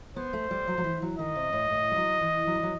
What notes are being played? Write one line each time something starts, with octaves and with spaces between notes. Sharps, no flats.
B3 C5
A3
G3
F#3
F#3
E3
F#3
D#3 D#5
C3
A2
A2
G3
F#3
E3
F#3
G3
F#3